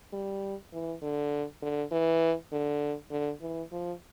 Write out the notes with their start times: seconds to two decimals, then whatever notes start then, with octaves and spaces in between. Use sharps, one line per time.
0.13 G3
0.72 E3
1.02 D3
1.62 D3
1.92 E3
2.52 D3
3.11 D3
3.41 E3
3.71 F3